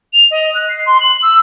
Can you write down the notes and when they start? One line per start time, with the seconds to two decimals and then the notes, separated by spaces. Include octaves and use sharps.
0.13 F7
0.31 D#5
0.55 F#6
0.69 C7
0.86 C6
1.01 F#7
1.23 E6